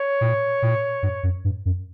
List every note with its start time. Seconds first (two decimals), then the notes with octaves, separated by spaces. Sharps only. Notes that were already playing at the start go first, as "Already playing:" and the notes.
Already playing: C#5
0.21 A#2
0.62 A#2
1.03 G2
1.23 F#2
1.44 G2
1.65 F#2